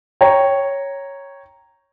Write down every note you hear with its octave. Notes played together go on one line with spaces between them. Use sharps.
C#5 G5 A#5